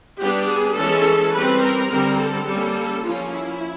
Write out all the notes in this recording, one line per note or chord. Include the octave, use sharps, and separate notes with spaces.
G3 B3 D4 G4
G#4
E3 G#3 C#4 A4
G3 C4 B4
A#4
D3 G3 C4
A4
G3 A#3 C#4
F3 A#3 C#4 F4
E4